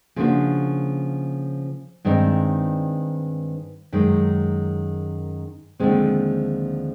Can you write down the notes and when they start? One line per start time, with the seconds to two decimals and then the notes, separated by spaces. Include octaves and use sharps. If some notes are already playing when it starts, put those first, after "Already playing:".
0.16 C#3 F3 A#3 D4 F#4
2.05 G2 D#3 G#3 C4 D#4
3.92 F#2 D#3 G#3
5.80 D#2 D3 F3 G#3 C4